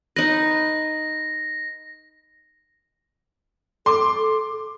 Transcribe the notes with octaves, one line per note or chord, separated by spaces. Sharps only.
D#4 B4 A#6
A4 C6 D6